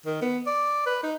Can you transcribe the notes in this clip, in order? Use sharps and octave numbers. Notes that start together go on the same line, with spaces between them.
D#3
B3
D5
B4
D#4